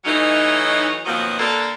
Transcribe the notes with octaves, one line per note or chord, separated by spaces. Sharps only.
E3 F#3 A3 C#4 D#4
B2 D#3 F3 F#3 A#3 C4
D3 A#3 D4 A4